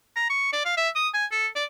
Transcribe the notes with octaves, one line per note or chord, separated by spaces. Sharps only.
A#5
C#6
D5
F5
E5
D#6
G#5
A4
D5